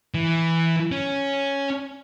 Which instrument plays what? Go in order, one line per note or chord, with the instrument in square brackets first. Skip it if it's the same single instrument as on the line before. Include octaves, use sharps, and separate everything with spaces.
[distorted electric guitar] E3
C#4